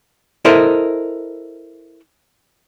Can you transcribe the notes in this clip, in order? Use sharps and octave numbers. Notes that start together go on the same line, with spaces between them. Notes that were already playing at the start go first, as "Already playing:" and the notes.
E4 A4 A#4 C5 D#5 E5